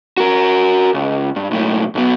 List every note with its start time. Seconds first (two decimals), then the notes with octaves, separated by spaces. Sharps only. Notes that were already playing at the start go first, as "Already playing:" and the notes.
0.18 F#4 A#4
0.94 C#2
1.36 G2
1.51 B1 A2
1.95 B1 B2